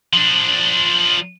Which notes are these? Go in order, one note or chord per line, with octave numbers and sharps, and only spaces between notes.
F3 D4